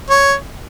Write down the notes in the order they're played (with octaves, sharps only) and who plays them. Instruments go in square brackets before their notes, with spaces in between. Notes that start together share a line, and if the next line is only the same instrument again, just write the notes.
[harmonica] C#5